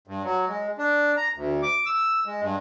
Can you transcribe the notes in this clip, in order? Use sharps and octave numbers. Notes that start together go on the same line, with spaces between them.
G2
F#3
G#3
D4
A#5
D2
D6
E6
G#3
G2